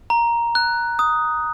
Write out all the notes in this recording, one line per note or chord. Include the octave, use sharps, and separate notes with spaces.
A#5
F#6
D#6